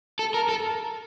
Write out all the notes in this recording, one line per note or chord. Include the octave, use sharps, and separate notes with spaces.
A4
A#4
A4